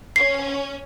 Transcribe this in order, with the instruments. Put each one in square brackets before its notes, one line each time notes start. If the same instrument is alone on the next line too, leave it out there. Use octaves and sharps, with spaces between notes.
[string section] C#4 [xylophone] C7